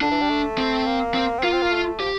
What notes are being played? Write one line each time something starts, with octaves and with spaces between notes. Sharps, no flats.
D3 D4
E3
G3
A3
C4
A#3
C4
C4
A#3 F4
C4
A#3
A3
F3 G4